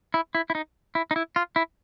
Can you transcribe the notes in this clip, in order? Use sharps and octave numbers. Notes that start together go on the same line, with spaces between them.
E4
E4
E4
D#4
E4
D#4
E4
F4
E4